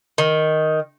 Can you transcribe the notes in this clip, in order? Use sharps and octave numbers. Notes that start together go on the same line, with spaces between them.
D#3